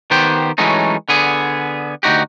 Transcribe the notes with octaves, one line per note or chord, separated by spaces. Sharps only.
D#3 B3 G4 C5
E3 F#3 G#3 A3 C#4 D#4
D3 B3 G#4
D2 G2 D#4 F#4 G4